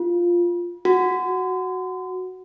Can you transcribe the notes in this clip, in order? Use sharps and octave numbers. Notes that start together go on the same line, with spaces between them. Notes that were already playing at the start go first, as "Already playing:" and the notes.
Already playing: F4
F#4